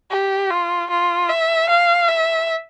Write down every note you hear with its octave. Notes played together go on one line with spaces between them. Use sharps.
G4
F4
F4
E5
F5
E5